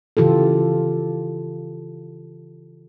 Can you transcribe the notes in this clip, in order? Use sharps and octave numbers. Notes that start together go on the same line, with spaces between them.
C#3 E3 F4 G4 A4